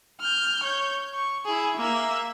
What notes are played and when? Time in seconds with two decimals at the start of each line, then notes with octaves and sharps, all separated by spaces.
0.20 F6 G6
0.63 C#5 G6
1.14 C#6
1.45 E4 G#4
1.77 A#3 E5